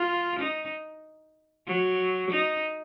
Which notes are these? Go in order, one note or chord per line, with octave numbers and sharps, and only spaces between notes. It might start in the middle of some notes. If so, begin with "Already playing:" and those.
Already playing: F4
D#4
F#3
D#4